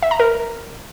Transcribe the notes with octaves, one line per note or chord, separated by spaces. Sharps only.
E5
A#5
A#4